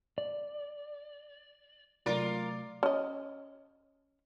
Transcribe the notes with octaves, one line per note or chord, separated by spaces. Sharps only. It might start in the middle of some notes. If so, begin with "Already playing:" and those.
D5
C3 F#3 A3 F4 A#4 D5
C#4 D#5